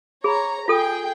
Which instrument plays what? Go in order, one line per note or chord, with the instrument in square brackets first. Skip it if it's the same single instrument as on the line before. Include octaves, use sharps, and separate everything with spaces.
[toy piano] G#4 B5 [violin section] C#5 A#5
[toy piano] F4 A4 D#6 [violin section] G#4 G5